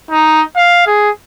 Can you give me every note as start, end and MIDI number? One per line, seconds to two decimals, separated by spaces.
0.11 0.42 63
0.56 0.86 77
0.87 1.10 68